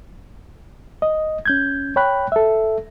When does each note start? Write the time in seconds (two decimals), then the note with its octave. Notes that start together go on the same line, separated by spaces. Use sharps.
1.02 D#5
1.46 C#4 G6 G#6
1.96 C#5 G5 B5 F#6
2.32 A4 E5